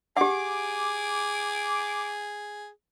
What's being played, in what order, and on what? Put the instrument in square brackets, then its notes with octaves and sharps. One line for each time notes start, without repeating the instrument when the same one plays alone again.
[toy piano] G4 F#5 [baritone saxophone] G#4 [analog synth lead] D6